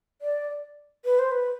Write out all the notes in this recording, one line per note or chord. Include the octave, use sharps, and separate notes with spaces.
D5
B4
C5
B4